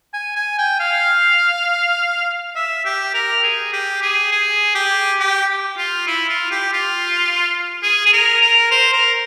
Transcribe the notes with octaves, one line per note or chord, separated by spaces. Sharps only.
G#5
G#5
G5
F5
E5
G4
A#4
G#4
G4
G#4
G#4
G4
G4
F4
E4
F4
G4
F4
G#4
G#4
A#4
A#4
C5
A#4